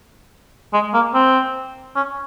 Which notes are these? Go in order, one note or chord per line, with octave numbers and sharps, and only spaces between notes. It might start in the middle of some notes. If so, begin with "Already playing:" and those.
G#3
A#3
C4
C#4